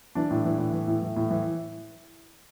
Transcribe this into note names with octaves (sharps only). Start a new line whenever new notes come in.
E3 D4
A2
E3
A2
E3
A2
E3
A2
E3